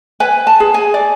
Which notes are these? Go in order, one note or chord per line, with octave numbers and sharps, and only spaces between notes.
B4 G#5
A5
G#4
G#5
D5